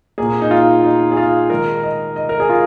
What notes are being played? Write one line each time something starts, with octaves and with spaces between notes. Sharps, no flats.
A#2 A#3 G#4
D#4
F4
D#4
G#4
F4
D#3 G#3 A#4
D#5
D#5
A#4
G#4
F4